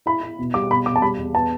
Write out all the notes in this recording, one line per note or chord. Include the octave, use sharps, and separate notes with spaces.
E4 B5
E4
B2
G3 D6
B2 B5
B2 D6
A5
G3 B5
E2
B3 A5